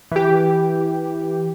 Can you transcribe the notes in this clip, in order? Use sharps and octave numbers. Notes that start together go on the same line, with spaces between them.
E3 G4